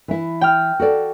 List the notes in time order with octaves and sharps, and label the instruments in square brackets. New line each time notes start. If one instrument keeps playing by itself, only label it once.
[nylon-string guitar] E3 E4
[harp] G5 F6
[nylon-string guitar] F#4 A4 D5